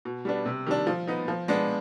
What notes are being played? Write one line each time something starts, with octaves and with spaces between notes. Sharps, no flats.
B2
G3 B3 D4
C3
D#3 G3 D4
F3
B3 D#4
F3
G#3 B3 D4